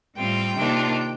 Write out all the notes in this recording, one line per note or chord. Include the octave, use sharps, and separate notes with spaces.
A2 G3 C4 F4 G5
C3 D#3 A#3 D4 F4